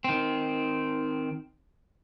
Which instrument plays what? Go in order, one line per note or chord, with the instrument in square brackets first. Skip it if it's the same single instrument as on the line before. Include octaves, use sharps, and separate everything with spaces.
[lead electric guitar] D#3 C4